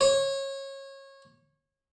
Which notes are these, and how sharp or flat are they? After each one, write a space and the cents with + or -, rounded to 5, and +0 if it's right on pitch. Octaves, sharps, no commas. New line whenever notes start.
C#5 -25